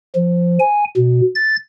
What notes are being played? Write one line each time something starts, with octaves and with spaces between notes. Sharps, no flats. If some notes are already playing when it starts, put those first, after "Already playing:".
F3
G#5
B2
A6